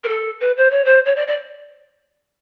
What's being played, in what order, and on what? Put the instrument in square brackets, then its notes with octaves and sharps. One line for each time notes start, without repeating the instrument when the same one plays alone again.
[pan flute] A#4
A4
B4
C5
C#5
C5
C#5
D5
D5